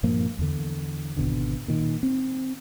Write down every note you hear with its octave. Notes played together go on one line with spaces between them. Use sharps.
G2 A#2 F3 A#3
E2 D3
G#1 B2 D3
A#2 D#3
C4